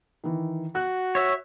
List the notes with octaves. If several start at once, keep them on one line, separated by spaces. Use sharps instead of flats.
D#3 E3
F#4 F#6
C#5 E5